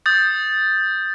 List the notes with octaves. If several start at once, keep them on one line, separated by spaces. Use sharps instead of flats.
D#6 G6 A6